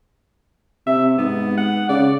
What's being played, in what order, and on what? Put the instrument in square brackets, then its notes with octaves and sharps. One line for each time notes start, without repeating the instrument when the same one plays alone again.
[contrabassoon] C3 [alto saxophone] E5
[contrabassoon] G#2 [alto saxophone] B3
[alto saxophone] F#5
[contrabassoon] C#3 [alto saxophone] D5